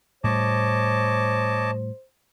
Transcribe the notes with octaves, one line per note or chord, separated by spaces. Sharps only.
A2 G3 C5 C#5 D#5 A5 D6